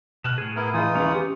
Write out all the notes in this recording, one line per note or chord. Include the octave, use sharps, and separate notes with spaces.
B2 F6 F#6 E7
A2 G#4
B3 E4 A#4
E3 D#4 F4 D#6
E2 E3 C#4
G4